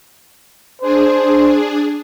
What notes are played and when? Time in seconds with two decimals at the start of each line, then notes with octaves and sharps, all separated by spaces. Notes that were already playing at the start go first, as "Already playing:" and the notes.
0.81 D4 G#4 C5